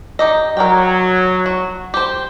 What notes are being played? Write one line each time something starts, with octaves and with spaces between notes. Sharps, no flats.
D#4 G4 D#5
F#3 A#4 D5 G5
F#4
G4 C5